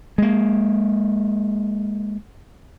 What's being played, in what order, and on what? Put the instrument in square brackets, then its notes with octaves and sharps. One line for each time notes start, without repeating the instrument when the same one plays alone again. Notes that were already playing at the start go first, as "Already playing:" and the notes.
[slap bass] G#3 A#3